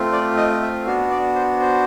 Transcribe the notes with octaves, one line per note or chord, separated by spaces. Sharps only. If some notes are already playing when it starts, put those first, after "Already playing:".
Already playing: A3 C4 F4
D5
D#5
E5
B3 D4 F#4 F5
D5
C5
C5